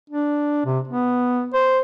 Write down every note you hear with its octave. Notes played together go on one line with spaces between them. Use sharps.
D4
C3
B3
C5